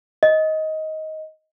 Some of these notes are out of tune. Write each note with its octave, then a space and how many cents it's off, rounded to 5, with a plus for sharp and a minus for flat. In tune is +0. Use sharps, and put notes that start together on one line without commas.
D#5 +15